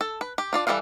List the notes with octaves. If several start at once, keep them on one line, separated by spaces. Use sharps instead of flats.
A4
B4
G4
D4 F4 D5
E3 G3 A4 B4 F5